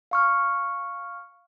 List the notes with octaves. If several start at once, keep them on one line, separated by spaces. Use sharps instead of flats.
F5 C#6 F6